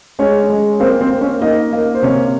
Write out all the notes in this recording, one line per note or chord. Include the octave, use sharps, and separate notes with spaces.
G#3 C#4 C#5
G#3
A#3 C4 C5
C4 C5
A#3
C#4 C#5
A#3 D#4 D#5
A#3
C5
C3 C#4 C#5